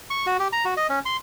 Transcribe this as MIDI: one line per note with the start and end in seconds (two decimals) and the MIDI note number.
0.10 0.26 85
0.26 0.37 66
0.39 0.48 67
0.53 0.65 82
0.65 0.74 66
0.77 0.87 75
0.89 0.99 61
1.06 1.17 84